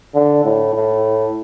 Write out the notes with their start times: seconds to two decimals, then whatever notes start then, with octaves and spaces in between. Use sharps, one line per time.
0.15 D3
0.44 A2
0.74 A2